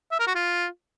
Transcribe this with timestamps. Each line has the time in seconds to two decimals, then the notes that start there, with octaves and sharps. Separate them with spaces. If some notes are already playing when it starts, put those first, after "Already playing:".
0.12 E5
0.19 A#4
0.27 F#4
0.35 F4